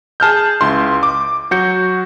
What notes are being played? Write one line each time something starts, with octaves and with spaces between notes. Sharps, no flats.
G#4 A5 F6 G6
C#2 E4 C6
D6
F#3 F#4 G6 C#7